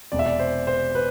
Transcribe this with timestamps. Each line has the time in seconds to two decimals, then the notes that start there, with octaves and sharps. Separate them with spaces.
0.12 E1 E2 C3 D5
0.19 E5
0.26 D5
0.39 C5
0.67 C5
0.95 B4